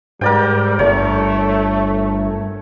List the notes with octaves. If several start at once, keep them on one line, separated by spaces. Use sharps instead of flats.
G#2 G3 A#4 D5 G5
G1 A3 C#5